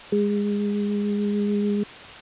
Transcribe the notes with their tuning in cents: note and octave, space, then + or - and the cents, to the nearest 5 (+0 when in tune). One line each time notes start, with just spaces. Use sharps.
G#3 -20